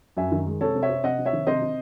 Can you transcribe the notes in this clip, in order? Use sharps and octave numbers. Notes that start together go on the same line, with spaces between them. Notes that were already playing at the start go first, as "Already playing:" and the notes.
F#2 E5 G#5
D#3
G#3
C3 A4 C#5
C3
C#5 E5
C4
C3 D#5 F#5
C3
C#5 E5
D#3
C3 C5 D#5
C3